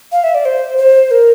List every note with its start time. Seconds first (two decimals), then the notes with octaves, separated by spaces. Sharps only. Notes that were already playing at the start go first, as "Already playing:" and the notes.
0.12 F5
0.24 E5
0.35 D5
0.45 C5
0.78 C5
1.11 A#4